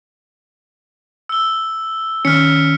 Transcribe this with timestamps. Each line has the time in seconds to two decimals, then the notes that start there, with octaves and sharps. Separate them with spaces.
1.29 E6 G7
2.25 D#3 C#4 F6 B6 C#7